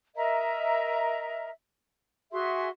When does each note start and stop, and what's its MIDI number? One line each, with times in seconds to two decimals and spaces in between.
0.15 1.49 70
0.15 1.49 75
0.15 1.49 76
0.15 1.49 82
2.32 2.68 66
2.32 2.68 68
2.32 2.68 76
2.32 2.68 84